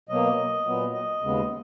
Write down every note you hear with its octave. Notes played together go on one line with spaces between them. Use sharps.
B2 F#3 A#3 D#5
A#2 F#3 B3
D#5
D#2 C#3 G#3 B3